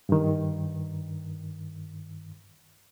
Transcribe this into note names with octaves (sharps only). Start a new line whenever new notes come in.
G2 D#3